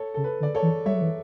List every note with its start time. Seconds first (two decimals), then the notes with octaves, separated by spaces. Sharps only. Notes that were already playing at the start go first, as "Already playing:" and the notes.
Already playing: A4 C#5
0.14 C#3 A4
0.24 B4
0.40 D3
0.43 D5
0.55 A4 C#5
0.62 E3
0.86 G3 C#5 E5
0.94 F#3
1.01 E3